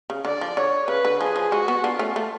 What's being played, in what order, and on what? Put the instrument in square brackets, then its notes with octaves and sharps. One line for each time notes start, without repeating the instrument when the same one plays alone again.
[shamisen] C#3
[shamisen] D3 [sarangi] D5
[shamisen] F3
[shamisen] D3 [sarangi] C#5
[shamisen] C#3 [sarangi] B4
[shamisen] D3
[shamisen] F3 [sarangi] G#4
[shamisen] F3
[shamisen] G#3 [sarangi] F#4
[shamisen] B3
[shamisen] B3 D4 [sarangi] F4
[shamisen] A3 C#4
A3